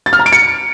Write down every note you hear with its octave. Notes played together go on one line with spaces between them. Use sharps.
A6
F6
A#5
D7
C#7